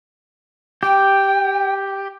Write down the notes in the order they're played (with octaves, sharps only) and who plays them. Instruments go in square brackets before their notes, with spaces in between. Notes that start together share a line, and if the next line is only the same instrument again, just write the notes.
[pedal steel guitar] G4 [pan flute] G5